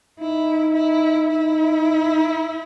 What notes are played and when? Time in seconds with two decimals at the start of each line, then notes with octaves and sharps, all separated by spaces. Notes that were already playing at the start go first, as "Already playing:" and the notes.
0.20 D#4 E4
0.75 E4
1.29 D#4 E4